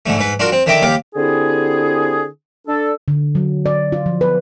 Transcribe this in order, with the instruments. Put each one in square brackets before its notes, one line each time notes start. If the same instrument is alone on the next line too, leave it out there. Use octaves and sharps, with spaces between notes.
[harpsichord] G#2 D3 A3
G#2 B4
D4 F4 F#4 A#4
C4
D3 D#3 E5 G5 A#5 D6
D#2 G4 F5 D6
[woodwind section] D3 C4 E4 G4 G#4
D4 A4
[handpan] D3
F#3
D5
F4
F3
B4